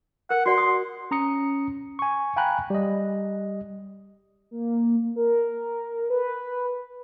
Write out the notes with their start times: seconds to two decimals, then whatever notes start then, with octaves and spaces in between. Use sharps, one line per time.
0.30 A#4 F#5
0.46 F#4 D5 F#5 C6
0.58 D#6
1.11 C#4 A#5 D#6 C#7
1.99 G#5 C#6
2.36 F5 G5 G#5 A#5 B5 F#6
2.70 G3 D#5
4.51 A#3
5.16 A#4
6.10 B4